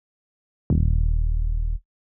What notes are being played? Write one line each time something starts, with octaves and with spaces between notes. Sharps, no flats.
D#1